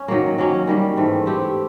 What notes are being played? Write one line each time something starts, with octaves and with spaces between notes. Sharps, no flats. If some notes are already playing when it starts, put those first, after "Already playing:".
Already playing: C#4
D#3 F#3 A#3
F#3 A#3 C#4
D#3 G3 A#3
G#2 E3 A3
A3 C4 E4 G4